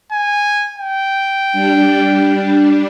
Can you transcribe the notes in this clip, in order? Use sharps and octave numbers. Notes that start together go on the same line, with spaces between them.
G#5
G5
G3 D4